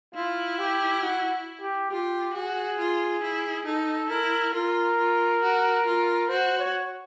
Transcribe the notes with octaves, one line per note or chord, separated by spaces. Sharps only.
E4 F4
G4
F#4
G4
F4 G4
F#4 G#4
F4
E4
D#4 A4
E4 A#4
F4 A#4
F4
F#4
F4
F#4 C5
C#5